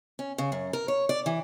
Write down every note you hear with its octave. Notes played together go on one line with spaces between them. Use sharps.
C#4
C#3
F#2
A#4
C#5
D5
E3